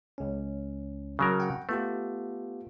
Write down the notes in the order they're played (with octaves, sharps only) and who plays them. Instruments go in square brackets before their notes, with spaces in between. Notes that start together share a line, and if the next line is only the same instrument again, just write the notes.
[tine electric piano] C#2 C#4
[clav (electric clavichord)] C#3 F#3 A#4
[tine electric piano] F#5 G5
[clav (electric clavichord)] A3 [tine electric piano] B3 F4 G4